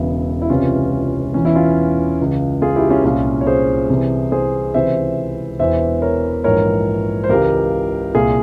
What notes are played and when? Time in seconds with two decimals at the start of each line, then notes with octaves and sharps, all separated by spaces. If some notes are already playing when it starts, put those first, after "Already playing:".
Already playing: E1 E2 C#3 E3 E4
0.42 E4
0.50 C#2 C3 E3 C#4 F4
1.34 E1 E2 E3 C#4
1.45 E4
1.55 C#4 F4
2.19 C#2 C#3 E3
2.62 F4 G#4
2.76 E4 G4
2.90 C#4 F4
3.04 C2 A#2 C#4 F4
3.41 C#5
3.47 G#4 C5
3.90 C2 C3 E3
4.32 G#4 C5
4.74 C#2 C3 E3 C5 E5
5.59 E1 E2 E3 C5 E5
6.02 A#4 C#5
6.44 A#1 G#2 E3 A#4 C#5
7.24 C5
7.30 C#2 C#3 E3 G4 A#4
8.15 C2 A#2 F4 G#4